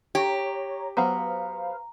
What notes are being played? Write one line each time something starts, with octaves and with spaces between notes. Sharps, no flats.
G4 C#5 A#5
F#3 B3 B4 C5 F5 A#5